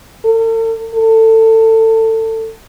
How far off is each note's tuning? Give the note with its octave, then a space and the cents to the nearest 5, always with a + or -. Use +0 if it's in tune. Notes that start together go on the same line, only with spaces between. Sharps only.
A4 +45
A4 +25